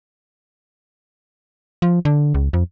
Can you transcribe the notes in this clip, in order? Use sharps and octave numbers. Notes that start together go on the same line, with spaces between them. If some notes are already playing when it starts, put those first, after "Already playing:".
F3
D3
C#2
F2